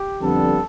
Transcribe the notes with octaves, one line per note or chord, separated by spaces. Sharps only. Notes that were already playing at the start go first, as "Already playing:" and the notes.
Already playing: G4
F2 D3 G3 B3 A4